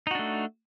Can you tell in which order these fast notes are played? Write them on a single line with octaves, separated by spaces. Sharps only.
D#4 F#4 D4 A3